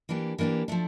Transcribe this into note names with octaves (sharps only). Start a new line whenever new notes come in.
E3 A#3 D4 G4
E3 A#3 D4 G4
F3 A3 D4